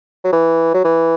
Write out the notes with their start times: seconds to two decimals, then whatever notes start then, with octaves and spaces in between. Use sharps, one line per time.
0.24 F#3
0.33 E3
0.74 F#3
0.84 E3